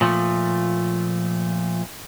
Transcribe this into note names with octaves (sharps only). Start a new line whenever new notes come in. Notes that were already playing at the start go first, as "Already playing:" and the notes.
A#2 F3 A3